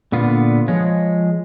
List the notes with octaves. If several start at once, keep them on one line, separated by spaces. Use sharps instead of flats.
A#2 D3 B3 F4
F3 G#3 C#5